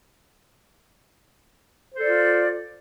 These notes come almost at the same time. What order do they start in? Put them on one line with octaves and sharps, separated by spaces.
C5 A4 D5 F4